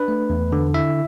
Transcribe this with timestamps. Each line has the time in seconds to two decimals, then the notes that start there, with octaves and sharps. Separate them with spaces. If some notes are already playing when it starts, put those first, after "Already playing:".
Already playing: D4 B4
0.08 A3
0.30 E2
0.52 D3
0.74 E4 E5